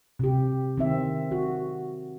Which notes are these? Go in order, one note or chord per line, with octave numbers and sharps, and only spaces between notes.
C3 G4
D#3 C4 E5
F#4